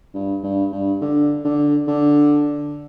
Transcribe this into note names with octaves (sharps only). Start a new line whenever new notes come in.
G2
G2
G2
D3
D3
D3